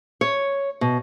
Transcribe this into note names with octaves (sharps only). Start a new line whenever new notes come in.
C#5
B2